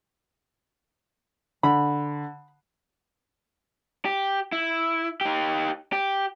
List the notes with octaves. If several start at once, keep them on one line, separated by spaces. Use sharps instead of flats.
D3 B5
G4
E4
D#4 G4
G4